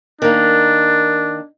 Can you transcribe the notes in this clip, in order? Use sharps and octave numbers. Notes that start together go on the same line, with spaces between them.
D#3 A#3 D4